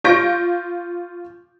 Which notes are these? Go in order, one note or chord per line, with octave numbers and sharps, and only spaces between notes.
F4 C#6 G6 A#6 D7